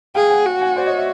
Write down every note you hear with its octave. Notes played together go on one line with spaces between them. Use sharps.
G#4 F5 G5
F#5 G#5
F#4
F#5 G#5
C5 D5
C#5 D#5
D5 E5